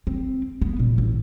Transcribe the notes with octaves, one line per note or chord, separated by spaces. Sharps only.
C4
B3
A#2
A1